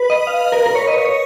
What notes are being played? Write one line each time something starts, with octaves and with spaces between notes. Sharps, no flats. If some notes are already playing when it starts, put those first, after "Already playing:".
Already playing: B4
D#5
F5
A#4
A#4
C#5
B4
D#5
C#5
C#5